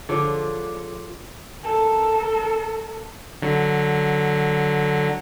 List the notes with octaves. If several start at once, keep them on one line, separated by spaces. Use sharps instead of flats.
D3 F3 F4 G#4 C#5 D6
A4 A#4
D3 F#3